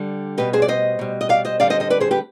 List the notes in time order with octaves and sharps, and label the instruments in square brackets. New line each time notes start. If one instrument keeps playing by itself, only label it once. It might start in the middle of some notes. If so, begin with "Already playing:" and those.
Already playing: [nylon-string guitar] D3 G3
B2 G3 G4 B4
G#4 C5
D5
C5 D#5
B2 G3
D#5
D5 F5
C5 D#5
D3 G3 D5 F5
C5 D#5
C5 D#5
B4 D5
G#4 C5
G4 B4